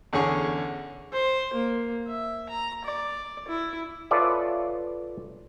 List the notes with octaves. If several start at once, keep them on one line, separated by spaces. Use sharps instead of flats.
E2 D3 C#4 G#4 C#6
C5
A#3
E5
A#5
D5
E4
F4 A4 B4 C#5 D5 E5